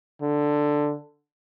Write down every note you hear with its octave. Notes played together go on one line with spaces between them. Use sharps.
D3